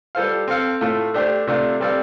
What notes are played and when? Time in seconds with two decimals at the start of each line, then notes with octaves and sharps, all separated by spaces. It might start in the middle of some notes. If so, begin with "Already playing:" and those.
0.15 G3 F4 A4 C5 F5
0.48 C4 A4 F5
0.81 A2 A3 F4 A4
1.14 A3 D4 G4 C5
1.47 C3 A3 D4 F4
1.80 G3 C4 A4 D5 F5